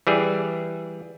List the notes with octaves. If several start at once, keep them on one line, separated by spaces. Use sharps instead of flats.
E3 G3 G#4